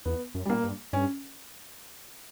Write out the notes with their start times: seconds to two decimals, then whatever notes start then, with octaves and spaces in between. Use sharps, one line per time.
0.05 E2 B3
0.34 F#2
0.45 G3
0.50 A#2 A#3
0.64 G2
0.93 G2 C#4